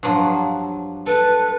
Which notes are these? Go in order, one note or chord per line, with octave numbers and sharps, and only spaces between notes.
G2 F3 F#3
A4 B4